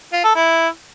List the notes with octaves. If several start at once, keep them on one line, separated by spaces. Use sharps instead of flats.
F4
A4
E4